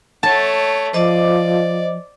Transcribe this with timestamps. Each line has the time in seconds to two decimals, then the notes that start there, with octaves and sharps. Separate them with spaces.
0.23 A3 C#5 A5
0.94 F3 C5 D5 D#5 D6